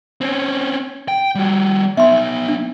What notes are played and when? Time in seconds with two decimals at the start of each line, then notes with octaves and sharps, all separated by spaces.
0.21 C4 C#4
1.08 G5
1.35 G3 F#4
1.97 B3 D#4 E5 C6
2.48 D4